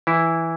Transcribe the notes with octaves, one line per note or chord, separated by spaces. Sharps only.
E3 E4